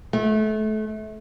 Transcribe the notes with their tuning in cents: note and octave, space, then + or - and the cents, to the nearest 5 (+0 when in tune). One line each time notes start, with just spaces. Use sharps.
A3 -30